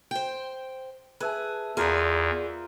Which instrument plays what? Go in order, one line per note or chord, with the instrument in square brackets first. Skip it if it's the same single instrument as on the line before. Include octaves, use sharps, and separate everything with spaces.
[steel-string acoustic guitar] C5 G5
[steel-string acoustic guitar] G#4 [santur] B4 E5 A5
[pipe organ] E2 [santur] F4 A#4 [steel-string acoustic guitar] G#4 B4 D5